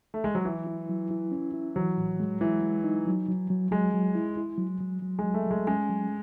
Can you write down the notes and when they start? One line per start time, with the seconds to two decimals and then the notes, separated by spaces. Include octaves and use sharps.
0.14 A3
0.24 G#3
0.35 F#3
0.45 E3 E4
0.67 E4
0.89 F#3
1.11 E4
1.32 C#4
1.54 E4
1.76 E3 F#3
1.97 A2
2.20 G#3
2.41 E3 G#3
2.63 G#3
2.84 D#4
3.07 F#3
3.29 F#3
3.50 F#3
3.71 F#3 G#3
3.94 F#3
4.15 E4
4.37 E4
4.58 F#3
4.81 F#3
5.02 F#3
5.19 G#3
5.24 F#3
5.34 A3
5.46 F#3 G#3
5.67 G#3 C#4
5.89 F#3